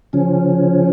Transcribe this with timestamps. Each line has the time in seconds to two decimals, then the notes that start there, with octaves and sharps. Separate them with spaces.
0.13 C#3 F3 C#4